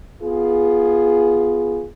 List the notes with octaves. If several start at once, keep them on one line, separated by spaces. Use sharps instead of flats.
B3 F4 G#4